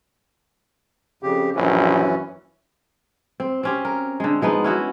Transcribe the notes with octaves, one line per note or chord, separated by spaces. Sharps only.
F2 C#3 G4
A#1 F#2 E3 C#4
C4
C4 C#4 G4
A#4
D3 G#3
F3 G#3 B3 D#4
C#4 E4 F#4